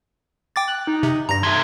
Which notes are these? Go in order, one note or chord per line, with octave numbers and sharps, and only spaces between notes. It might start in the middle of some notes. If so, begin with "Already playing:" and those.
G5 D6 A6
F#6
D#4
C3
G2 A#5 A#6
C3 A3 G#6